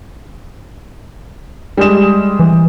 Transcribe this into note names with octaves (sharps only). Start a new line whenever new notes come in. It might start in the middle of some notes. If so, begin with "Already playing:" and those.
G3 G#3 E7
E3